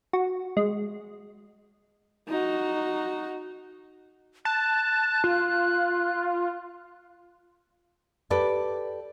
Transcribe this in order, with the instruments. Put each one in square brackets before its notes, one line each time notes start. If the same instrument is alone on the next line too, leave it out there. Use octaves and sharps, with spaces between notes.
[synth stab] F#4
G#3
[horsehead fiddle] D#4 F#4
[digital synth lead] A5 [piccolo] F#6
[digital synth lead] F4
[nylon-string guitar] G4 A4 B4 D5